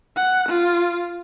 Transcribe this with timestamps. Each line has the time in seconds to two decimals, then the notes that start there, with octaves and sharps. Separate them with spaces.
0.16 F#5
0.49 F4